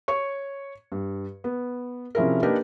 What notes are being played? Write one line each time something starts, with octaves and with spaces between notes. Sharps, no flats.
C#5 C#6
G2
B3
C3 F3 C#4 E4 G#4 A#4
A#3 D4 D#4 G4 A#4 B4